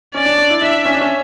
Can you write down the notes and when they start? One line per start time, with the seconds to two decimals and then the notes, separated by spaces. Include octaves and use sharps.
0.14 C#4 D5
0.25 D4
0.38 D4
0.50 E4
0.62 D4 E5
0.85 C#4
0.94 D4
1.01 C#4